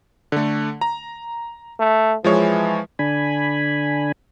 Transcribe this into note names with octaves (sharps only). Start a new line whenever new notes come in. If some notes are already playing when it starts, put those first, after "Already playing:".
D3 A3
A#5
A3
E3 F3 G#3 C#5
D3 D4 G#5 B5